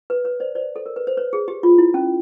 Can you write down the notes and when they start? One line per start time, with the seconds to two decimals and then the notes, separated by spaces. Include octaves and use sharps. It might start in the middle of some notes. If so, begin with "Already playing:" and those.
0.10 B4
0.25 B4 C#5
0.40 C5 D5
0.55 C5 D5
0.76 A4
0.86 A#4
0.96 B4
1.07 C5
1.17 B4 C#5
1.33 G#4
1.48 G4
1.63 F4
1.78 E4
1.94 C#4